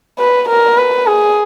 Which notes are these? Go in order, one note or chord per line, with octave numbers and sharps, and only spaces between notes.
B4
A#4
B4
G#4